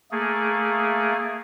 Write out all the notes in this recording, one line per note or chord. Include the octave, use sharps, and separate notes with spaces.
A3 A#3 G#4